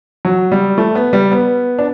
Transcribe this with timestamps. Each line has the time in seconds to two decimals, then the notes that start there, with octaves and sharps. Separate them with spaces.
0.25 F#3
0.52 G3
0.78 A3
0.95 B3
1.13 G3
1.32 B3
1.79 D4